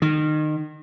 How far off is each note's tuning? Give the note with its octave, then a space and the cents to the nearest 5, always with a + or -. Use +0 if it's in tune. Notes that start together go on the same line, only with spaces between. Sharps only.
D#3 -25